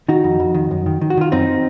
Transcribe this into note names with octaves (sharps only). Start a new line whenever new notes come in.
D#3 D#4 F#4
F2
F2
D#3
F#2
D#3
D#3
F#4
D#3 F4
F#2 C4 D#4